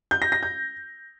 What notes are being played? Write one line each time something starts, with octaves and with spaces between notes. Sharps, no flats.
G6
A#6
A#6
G6